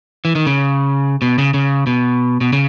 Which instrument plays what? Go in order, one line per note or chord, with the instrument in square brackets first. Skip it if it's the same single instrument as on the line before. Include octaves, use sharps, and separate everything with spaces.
[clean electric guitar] E3
D#3
C#3
B2
C#3
C#3
B2
B2
C#3